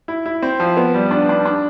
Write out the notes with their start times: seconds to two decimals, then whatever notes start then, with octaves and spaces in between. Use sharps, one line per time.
0.08 E4
0.26 E4
0.43 C4
0.60 F3
0.77 B3
0.94 G3
1.11 D4
1.29 D4
1.45 D4